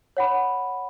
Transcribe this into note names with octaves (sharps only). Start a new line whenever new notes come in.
C#5 F#5 B5